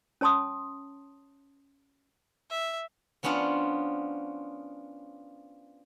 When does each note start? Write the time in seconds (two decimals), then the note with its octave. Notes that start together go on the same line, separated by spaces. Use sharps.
0.21 C#4 C#5 A5 C6 D#6
2.50 E5
3.23 F3 B3 C#4 D4 F4